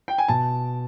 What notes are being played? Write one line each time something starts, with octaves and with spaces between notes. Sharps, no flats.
G5
G#5
B2 A5